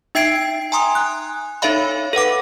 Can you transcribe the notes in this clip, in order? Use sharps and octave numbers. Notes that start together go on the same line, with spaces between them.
D#4 E5 G5 G#6 C7 D7
G#5 A#5 C6 D#6
F#6
D#4 A4 C#5 E5 F5 B5
A4 B4 F#5 D6